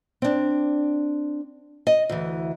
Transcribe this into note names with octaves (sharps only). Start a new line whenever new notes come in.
C4 D4
D#5
D2 E3